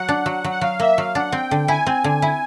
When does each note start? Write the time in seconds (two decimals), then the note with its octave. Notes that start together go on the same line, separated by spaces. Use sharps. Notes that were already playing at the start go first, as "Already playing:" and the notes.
Already playing: F#3 F#5
0.09 D4
0.26 F#3
0.44 F#3
0.50 F#5
0.61 F#3 F5
0.79 A#3 E5
0.98 F#3 F5
1.15 D4 F#5
1.32 C4 G5
1.51 D3
1.68 E4 G#5
1.87 C4
2.04 D3
2.22 E4